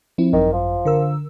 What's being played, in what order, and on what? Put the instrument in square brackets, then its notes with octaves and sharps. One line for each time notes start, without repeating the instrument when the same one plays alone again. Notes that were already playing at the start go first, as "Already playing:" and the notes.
[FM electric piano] F3 C4 E4
[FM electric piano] G#1 F#2 [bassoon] D#3
[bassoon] F3
[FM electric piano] D3 A#4 E6